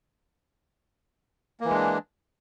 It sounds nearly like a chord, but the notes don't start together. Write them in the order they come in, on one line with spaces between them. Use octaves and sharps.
A#3 E3 G#3 D4